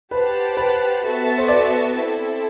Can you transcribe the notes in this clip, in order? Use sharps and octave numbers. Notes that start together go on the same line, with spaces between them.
G4 B4 C5 F#5 A5
B4
B3 F#4 A4 E5 A5
C5
D5
C4 E4 A4